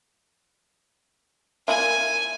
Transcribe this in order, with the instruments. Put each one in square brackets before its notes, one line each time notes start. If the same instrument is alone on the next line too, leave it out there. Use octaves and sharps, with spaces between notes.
[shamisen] A#3 E4 F4 [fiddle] G#5